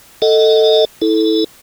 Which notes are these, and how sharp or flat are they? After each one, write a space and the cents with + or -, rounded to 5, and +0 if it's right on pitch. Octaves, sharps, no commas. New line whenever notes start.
A4 +10 D#5 +0 F#5 +0
E4 -20 A4 -10